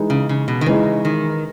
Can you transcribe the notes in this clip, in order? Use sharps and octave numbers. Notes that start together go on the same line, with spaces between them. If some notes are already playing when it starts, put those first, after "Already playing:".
Already playing: E3 G#3 D#4
C#3
C#3
B2
D#3
C#3 E3 G#3 D#4
D#3